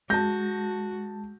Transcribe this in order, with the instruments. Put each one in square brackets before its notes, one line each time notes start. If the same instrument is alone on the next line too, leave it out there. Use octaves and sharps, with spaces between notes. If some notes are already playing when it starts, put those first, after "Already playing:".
[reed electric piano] G#3 [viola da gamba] F#4 [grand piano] A5 A#6 [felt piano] G6